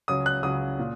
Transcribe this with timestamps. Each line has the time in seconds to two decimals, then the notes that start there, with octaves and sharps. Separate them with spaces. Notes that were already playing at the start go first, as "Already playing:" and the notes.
0.08 C#2 C#3 F#3 D#6
0.26 F#6
0.43 C#2 C#3 F#3 D#6
0.79 A#2